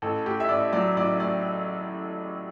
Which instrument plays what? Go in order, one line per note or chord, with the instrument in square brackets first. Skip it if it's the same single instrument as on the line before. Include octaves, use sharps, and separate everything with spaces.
[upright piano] A1 A4
A2 G4
E5
A1 D5
F#3 D5
A1 D5
A2 D5